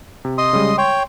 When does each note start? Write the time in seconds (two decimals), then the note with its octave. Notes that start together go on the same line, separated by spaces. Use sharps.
0.25 C3
0.38 D#5 C6 D#6
0.53 C#3 G3 G#3
0.78 C#5 G5 C6